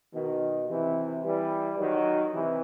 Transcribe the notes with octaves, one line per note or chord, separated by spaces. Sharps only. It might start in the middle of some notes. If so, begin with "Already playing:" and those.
B2 D#3
C3 E3
E3 G3
D#3 F#3
C3 E3